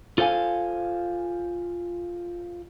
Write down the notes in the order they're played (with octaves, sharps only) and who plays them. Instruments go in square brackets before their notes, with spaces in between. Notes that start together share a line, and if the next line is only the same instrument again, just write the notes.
[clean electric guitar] F4 A4 C5 D5 F5 G#5